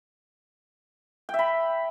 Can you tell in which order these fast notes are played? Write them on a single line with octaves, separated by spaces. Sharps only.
G5 E5 B5